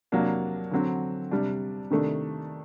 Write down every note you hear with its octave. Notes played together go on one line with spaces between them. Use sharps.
C3 F#3 A#3 D4
D3 F#3 C4
C3 G3 D4
C3 D#3 A3 D4